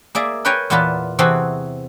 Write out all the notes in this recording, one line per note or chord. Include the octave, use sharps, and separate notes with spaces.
A#3 G#4 D5 E5
A#4 B4 C#5 G5 G#5 A#5
E2 A#2 B3 F4 B4 A5
C3 E3 C4 F#4 G#4 A4